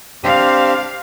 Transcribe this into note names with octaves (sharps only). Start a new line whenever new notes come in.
C4 D4 G4 F5